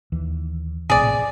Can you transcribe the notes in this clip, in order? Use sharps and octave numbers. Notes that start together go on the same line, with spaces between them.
D#2 E3
A#1 A2 C3 G#4 D5